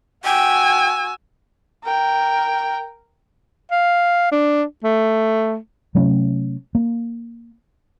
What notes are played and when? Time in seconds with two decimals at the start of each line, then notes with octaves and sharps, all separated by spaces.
0.24 F#4 G5 G#5 E6
1.84 A#4 G5
3.71 F5
4.32 D4
4.84 A3
5.95 C3 F#3 A3 C#4
6.75 A#3